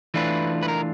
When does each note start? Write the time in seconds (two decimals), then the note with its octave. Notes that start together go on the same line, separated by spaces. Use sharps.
0.14 E3 A3 D4 F4 B4
0.63 B4
0.68 A#4